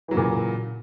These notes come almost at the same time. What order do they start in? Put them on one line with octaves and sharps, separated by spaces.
E3 F#3 C#3 A#2